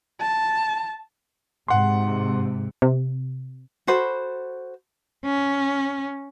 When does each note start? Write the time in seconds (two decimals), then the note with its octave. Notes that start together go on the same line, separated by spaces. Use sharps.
0.21 A5
1.68 G#2 C3 F#5 C6
2.82 C3
3.87 F#4 A4 C5 B5
5.25 C#4